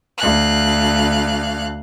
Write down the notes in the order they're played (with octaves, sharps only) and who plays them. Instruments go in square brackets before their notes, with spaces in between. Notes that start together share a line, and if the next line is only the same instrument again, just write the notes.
[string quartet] D2 F5 F#6